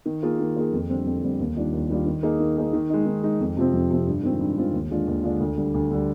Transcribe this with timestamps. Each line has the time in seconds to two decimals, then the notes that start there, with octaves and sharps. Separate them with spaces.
0.06 D#3
0.23 A#3 F4 G#4
0.40 D#3
0.56 A#3 F4 G#4
0.72 F2
0.90 D3 G3 C4
1.06 F2
1.23 D3 G3 C4
1.39 D#2
1.56 D#3 G3 D4 F4
1.73 D#2
1.90 D#3 G3 D4 F4
2.06 D#3
2.23 A#3 D#4 G#4
2.40 D#3
2.57 A#3 D#4 G#4
2.73 D#3
2.90 G#3 D#4
3.06 D#3
3.23 G#3 D#4
3.40 F2
3.57 C3 F3 C4
3.73 F2
3.91 C3 F3 C4
4.07 G2
4.23 D#3 G#3 C4 F4
4.40 G2
4.57 D#3 G#3 C4 F4
4.73 D#2
4.90 D3 G#3 D4 F4
5.07 D#2
5.24 D3 G#3 D4 F4
5.40 D2
5.57 D3 G3
5.74 D2
5.91 D3 G3